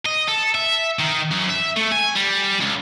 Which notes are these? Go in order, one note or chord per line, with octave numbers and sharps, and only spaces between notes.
D#5
A4
E5
D#3
F#2
E5
A3
G#5
G3
C#2